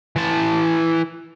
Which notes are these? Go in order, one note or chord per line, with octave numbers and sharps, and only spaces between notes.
E3 A5